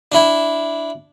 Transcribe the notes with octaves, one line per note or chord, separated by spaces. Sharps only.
D4 E4